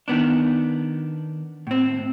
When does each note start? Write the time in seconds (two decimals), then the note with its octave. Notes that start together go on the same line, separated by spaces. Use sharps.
0.08 D#3 B3 D4
1.67 A2 C4